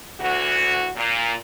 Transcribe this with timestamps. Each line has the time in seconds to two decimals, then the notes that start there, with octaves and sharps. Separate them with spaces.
0.19 D2 E3 F#4
0.95 A#2